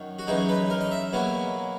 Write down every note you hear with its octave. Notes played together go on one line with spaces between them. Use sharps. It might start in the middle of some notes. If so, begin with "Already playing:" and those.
Already playing: F#2 D#3 F#3
F#4
F#2 E3 G#3 D#4 G#4
B4
A#4
D#5
E5
B2 F#3 A#3 E4